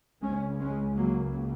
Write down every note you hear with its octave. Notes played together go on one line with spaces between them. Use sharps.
C#2 C#3 G#3 C#4
G#3 C#4
F#3 A#3